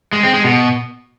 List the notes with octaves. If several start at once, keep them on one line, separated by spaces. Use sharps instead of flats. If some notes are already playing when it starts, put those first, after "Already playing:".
G#3
C4
G#3
B2